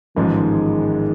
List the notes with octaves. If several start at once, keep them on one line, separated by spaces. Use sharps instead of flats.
A1 G#2 D#3 F3 G#3